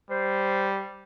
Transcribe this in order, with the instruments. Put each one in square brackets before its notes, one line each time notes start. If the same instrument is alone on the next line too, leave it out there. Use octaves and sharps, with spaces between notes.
[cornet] G3 [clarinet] C5